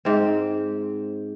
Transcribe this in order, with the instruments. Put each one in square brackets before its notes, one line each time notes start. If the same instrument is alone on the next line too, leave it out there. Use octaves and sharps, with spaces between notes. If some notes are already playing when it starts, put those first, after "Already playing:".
[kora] G#2 C4